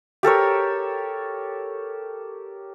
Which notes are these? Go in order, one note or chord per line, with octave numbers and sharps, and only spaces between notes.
G4 A4 A#4 C#5